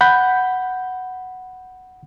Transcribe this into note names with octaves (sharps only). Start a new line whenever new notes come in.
F#5 B5 G6